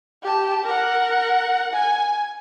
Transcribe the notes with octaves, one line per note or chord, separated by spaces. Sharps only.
G4 A5
A#4 F#5
G#5